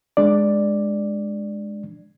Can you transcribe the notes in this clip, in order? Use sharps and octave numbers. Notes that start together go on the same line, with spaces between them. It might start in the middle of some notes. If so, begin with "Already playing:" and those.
G#3 D4 D5